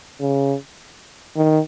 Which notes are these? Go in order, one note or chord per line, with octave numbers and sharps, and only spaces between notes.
C#3
D#3